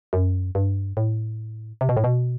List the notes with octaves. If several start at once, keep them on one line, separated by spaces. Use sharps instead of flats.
F#2
G2
A2
C3
B2
A2
B2